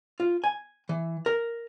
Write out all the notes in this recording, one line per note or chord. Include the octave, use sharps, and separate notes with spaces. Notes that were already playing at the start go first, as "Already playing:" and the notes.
F4
G#5
E3
A#4